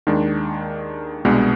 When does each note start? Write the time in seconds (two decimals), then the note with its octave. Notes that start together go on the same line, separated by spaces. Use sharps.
0.07 D#2 D#3 G#3 D4
1.25 C2 B2 G#3 B3 D4